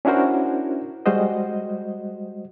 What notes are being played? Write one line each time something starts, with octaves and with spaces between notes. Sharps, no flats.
C#4 D4 E4 F#4 A#4 C5
G3 G#3 F#4 C5 D#5